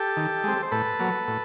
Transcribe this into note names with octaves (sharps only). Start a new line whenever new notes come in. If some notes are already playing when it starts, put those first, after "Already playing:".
Already playing: G4 A4
D#3
G#3 C4
C5
A2 A4 B4
F#3 A#3
A2